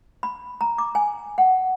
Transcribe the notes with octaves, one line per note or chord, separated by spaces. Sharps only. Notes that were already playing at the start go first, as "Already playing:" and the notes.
B5
A#5
D6
G#5
F#5